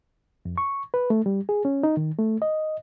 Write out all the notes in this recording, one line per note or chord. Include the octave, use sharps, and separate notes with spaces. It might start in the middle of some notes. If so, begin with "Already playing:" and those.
F2
C#6
B4
A3
G3
G#4
C#4
D#4
D#3
A3
D#5